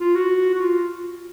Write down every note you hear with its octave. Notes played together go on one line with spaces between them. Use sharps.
F4
F#4
F#4
F4